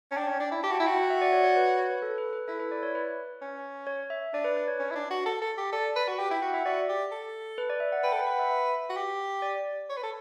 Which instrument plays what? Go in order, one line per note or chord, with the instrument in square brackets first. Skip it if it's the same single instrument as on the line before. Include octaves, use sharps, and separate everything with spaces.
[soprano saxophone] C#4 [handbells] A5
[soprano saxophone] D4 [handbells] G5
[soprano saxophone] C#4
D4
E4
[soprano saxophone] G4 [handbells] A5
[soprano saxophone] F#4 [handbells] G5
[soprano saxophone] E4
[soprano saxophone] F#4 [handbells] G5
[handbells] F#5
E5
D5
C#5
C#5
B4
B4
C#5
B4
A4
B4
B4
[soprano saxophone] E4 [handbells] A4
[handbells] B4
D5
C#5
B4
[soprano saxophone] C#4
[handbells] C#5
E5
[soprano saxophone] D4 [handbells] D5
[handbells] B4
B4
C#5
[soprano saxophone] C#4
E4
D4
F#4
A4
A4
G4
[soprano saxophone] A4 [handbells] D5
[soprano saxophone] B4
F#4
[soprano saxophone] G4 [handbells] G5
[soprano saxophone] E4 [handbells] G5
[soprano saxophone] F#4 [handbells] F#5
[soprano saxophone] E4 [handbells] E5
[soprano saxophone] F#4 [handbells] D5
[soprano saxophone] G4
A4
[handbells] B4
D5
E5
F#5
[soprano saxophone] B4 [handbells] G5
[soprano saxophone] A4
[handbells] G5
[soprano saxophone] B4
[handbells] F#5
E5
E5
[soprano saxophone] F#4
G4
[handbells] D5
[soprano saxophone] C#5
B4
A4